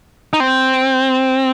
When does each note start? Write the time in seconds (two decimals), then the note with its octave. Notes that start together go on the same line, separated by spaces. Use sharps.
0.33 D#4
0.40 C4